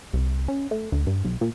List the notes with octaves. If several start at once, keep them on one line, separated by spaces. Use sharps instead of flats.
C2
C#4
A3
D2
G2
B1
A#2